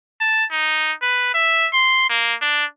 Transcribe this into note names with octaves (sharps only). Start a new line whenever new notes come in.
A5
D#4
B4
E5
C6
A#3
D4